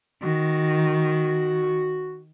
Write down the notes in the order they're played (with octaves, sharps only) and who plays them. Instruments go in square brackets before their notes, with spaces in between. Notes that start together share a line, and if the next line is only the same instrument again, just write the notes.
[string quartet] D#3 [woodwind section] F#4